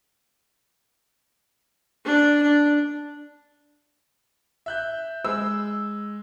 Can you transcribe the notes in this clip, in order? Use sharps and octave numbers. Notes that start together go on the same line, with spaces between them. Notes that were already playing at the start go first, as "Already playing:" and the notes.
D4
D4
E5 F#6 G6
G#3 E6